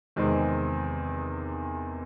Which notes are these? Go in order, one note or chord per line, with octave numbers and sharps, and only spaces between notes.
E2 C3 D#3 G#3 C4